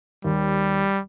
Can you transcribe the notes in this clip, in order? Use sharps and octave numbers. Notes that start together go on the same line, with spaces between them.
D#2 G3